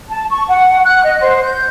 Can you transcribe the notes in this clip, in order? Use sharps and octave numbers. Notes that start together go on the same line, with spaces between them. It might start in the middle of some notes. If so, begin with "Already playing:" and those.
A5
C#6
F#5
F#6
D#5
C5
G6